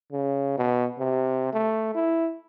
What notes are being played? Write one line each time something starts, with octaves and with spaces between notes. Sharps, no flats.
C#3
B2
C3
A3
E4